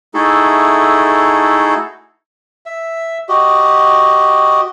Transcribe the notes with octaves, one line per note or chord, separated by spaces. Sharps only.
A3 D#4 E4 F#4 G#4 A4
E5
F#4 G4 D#5